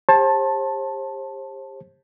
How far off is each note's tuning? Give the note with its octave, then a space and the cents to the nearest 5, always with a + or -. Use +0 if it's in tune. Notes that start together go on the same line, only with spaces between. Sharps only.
G4 +35 C5 +40 A5 +0